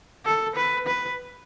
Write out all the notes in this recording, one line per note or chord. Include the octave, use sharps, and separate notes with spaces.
A4
B4
B4